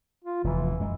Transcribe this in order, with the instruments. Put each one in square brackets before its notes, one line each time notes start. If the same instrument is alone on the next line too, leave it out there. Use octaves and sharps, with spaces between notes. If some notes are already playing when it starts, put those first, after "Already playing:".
[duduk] F4
[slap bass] F1 E2 [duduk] E3
[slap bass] F#2 G#3